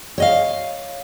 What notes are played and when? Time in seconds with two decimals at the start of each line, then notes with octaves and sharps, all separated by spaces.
0.18 C#5 D#5 F5